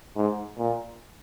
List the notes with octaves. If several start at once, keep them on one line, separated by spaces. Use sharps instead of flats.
G#2
A#2